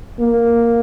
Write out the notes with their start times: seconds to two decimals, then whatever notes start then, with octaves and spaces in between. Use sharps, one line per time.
0.20 A#3